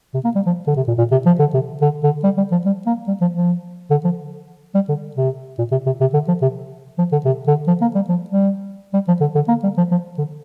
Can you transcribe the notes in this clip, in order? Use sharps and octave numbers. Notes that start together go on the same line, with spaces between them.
C3
A#3
G3
F3
D3
C3
A#2
A#2
C3
F3
D3
C3
D3
D3
G3
G3
F3
G3
A#3
G3
F3
F3
D3
F3
G3
D3
C3
A#2
C3
C3
C3
D3
F3
C3
F3
D3
C3
D3
F3
A#3
G3
F3
G3
G3
F3
D3
D3
A#3
G3
F3
F3
D3